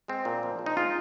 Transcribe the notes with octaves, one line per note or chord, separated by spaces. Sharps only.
G#3 C4
A#2
F3
F3
D#4
G#3 F4